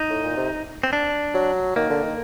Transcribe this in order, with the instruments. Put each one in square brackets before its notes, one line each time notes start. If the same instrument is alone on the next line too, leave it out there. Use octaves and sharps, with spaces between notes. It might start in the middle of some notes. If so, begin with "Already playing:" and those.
Already playing: [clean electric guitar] D#4
[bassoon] A2
A#2
C3
[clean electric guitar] C4
D4
[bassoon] F#3
[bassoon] D#3 [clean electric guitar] A#3
[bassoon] D3
D#3